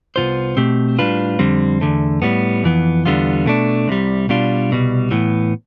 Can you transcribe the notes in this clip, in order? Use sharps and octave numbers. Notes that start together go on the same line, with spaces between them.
C2 B2 B3 F4 C5
B2 A3 C4 G4
A2 G3 D4 F4 B4
F2 D3 G3 C4
E2 D3 A3
A2 G3 B3
F2 E3 B3
E2 D3 G3 B3 F4
B2 A3 D4
C2 C3 G3
B2 G3 D4 F4
C2 B2 G3
A2 E3 B3